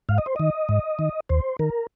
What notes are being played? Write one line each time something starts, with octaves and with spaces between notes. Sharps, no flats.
G#2 F5
D#5
C5
D#3 D#5
G#2
D#3
D#2 C5
D#3 A#4